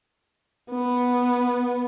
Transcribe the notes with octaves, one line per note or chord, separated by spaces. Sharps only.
B3